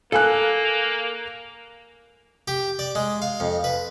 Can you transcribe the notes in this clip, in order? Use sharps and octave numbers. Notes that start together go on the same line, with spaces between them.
A#3 A4 F5 G#5 F#6
G4
D5
G#3
F5
F2
B4